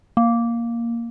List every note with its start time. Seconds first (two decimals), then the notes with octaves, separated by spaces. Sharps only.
0.17 A#3